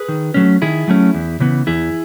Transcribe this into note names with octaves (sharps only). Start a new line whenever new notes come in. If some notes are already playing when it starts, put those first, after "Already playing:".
Already playing: G#4 B4
D#3
F#3 A3 C#4
D#3 E4 G#4
F#3 A3 C#4
E2
C#3 E3 B3
E2 E4 G#4